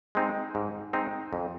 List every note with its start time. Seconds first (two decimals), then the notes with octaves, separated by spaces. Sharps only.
0.15 G#3 C4 D#4
0.55 G#2
0.93 G#3 C4 D#4
1.33 F2